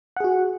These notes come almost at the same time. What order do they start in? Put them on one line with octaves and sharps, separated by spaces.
F#5 G#4 F#4